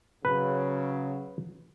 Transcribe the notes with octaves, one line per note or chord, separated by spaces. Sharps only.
C#3 F#3 B4